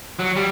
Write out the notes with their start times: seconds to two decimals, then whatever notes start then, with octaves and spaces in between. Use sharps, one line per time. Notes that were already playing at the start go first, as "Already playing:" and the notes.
0.19 F#3
0.36 G3